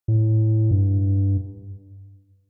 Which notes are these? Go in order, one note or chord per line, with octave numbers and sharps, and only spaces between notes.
A2
G2